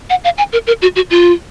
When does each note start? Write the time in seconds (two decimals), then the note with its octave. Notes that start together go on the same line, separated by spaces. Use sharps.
0.10 F#5
0.24 F5
0.38 G#5
0.52 A#4
0.67 A#4
0.82 F#4
0.96 F#4
1.10 F4